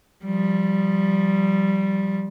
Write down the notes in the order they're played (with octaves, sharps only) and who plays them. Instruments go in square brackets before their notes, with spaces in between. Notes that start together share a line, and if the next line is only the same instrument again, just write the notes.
[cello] F3 G3